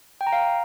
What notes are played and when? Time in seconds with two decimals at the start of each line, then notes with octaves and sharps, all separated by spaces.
0.21 G5
0.27 A#5
0.33 F5